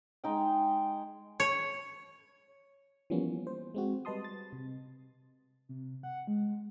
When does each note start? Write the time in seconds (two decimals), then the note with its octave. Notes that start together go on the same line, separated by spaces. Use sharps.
0.24 G#3 D#4 G5
1.40 C#5
3.10 E3 F3 G3 A#3 B3 C#4
3.47 C5
3.75 G#3 C4 F#4
4.05 G3 B4 D#5 A5 C6 D#6
4.24 A6
4.53 C3
5.69 C3
6.03 F#5
6.27 G#3